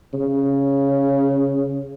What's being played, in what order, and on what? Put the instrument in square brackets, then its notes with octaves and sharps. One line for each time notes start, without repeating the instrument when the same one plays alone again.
[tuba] C#3